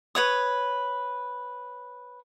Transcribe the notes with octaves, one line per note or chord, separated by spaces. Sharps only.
B4 C#5 D#6